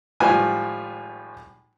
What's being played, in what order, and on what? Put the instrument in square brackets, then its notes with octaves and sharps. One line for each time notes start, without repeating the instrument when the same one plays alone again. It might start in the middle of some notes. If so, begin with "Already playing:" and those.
[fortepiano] G#1 A2 F3 G3 B4 G#5